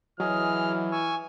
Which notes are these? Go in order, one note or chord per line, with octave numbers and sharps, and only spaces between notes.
E3 F#3 G#4 D#5 F6
G#5 C#6 E6